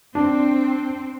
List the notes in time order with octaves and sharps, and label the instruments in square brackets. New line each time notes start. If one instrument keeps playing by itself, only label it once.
[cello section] C4 [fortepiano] D4